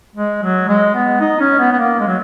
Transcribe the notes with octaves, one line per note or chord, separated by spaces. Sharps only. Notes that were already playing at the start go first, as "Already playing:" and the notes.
G#3
F#3
G#3
B3
D#4
C#4
B3
B3
A#3
G#3
F#3